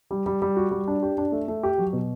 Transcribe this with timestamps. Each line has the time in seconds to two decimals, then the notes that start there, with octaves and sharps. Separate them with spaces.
0.11 G3
0.26 G3
0.42 G3
0.56 F#4
0.71 G3
0.88 D4
1.03 G4
1.18 D4
1.32 A3
1.48 A3
1.63 G4
1.78 F#3
1.93 B2